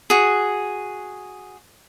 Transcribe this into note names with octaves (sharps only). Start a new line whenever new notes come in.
F#4 G#4